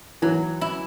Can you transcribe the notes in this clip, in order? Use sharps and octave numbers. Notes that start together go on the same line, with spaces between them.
E3 F#3
E4